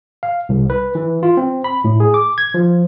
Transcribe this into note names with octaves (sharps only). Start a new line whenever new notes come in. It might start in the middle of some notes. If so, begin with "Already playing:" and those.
F5
C2
B4
E3
F4
C4
B5
A2
G#4
D6
G#6
F3